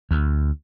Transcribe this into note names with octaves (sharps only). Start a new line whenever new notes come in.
D2